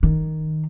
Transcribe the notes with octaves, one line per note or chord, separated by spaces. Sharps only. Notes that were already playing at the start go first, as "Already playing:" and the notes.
D#3